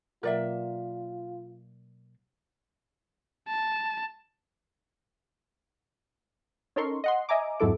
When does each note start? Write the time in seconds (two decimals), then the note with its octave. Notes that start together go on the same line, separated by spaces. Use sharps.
0.23 B2 F#3 A#3 F4 A#4 D5 E5
3.48 A5
6.76 C#4 D#4 A4 A#4 C6 C#6
7.04 D#5 F#5 C6
7.29 D#5 E5 G#5 A#5 D6
7.60 F2 G#2 F#3 E4 A4 D6